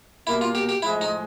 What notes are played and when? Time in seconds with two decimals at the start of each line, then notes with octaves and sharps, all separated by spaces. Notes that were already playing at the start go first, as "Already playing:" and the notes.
0.27 B2 G3 A#3 E4
0.41 F4
0.55 G4
0.69 G4
0.82 A2 F3 G#3 E4
1.01 D#4